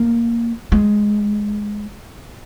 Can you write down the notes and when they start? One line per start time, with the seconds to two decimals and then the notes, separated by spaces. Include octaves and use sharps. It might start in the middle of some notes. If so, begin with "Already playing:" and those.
Already playing: A#3
0.72 G#3